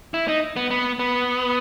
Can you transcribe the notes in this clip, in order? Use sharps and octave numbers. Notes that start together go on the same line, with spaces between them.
E4
D#4
B3
B3
B3